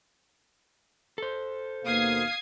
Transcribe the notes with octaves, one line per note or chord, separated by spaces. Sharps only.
A4 C5
D#2 B2 A#3 F5 D#6 G#6 C7